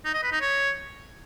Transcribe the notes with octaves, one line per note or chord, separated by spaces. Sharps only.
D#4
D#5
B4
D#4
C#5